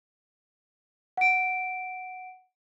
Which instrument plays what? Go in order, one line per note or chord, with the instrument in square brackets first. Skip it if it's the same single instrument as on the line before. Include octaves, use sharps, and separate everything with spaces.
[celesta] F#5 D7